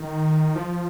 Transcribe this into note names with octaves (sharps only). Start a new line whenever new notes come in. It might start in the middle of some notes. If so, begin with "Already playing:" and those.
Already playing: D#3
F3